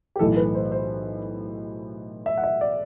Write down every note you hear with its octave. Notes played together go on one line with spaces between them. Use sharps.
G4
B1 A2 E3 A4
B4
C5
C5
E5
F#5
E5
D5